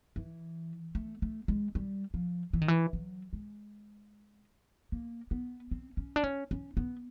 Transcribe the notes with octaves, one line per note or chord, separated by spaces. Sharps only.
E3
A3
A3
G#3
G3
F3
E3
D#3
E3
F#3
G#3
A#3
B3
C4
C#4
D4
C#4
C#4
B3